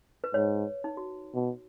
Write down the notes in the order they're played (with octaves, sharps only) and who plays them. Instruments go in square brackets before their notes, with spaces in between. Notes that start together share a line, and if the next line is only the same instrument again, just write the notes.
[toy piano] B4
[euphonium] G#2 [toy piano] C#5
[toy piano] D#4
F#4
[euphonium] B2